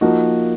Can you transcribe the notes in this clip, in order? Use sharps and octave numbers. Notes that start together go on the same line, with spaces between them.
F3 A#3 D#4 F#4